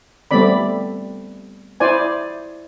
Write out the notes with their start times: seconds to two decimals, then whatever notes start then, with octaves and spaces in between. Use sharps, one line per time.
0.31 G3 A3 B3 C4 D5 B5
1.80 E4 C5 D5 G#5